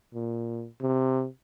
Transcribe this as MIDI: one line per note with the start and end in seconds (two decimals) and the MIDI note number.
0.14 0.66 46
0.81 1.26 48